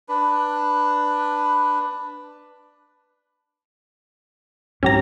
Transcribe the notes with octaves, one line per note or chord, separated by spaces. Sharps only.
D4 B4
G#2 F#3 C4 C#4 G4 A#5